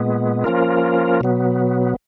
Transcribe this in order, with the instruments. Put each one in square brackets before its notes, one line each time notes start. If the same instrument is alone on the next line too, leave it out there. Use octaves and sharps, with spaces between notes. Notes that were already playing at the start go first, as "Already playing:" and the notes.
Already playing: [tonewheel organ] A#2 G#3 B3
F3 A#3 C#4 F4 A#4
B2 F#3 B3